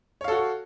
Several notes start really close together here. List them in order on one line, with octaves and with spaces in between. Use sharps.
C#5 F5 A4 F#4